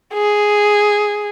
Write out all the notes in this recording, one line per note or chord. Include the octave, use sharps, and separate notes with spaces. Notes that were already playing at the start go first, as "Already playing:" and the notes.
G#4